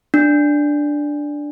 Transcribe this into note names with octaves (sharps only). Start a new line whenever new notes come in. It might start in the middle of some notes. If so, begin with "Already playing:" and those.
D4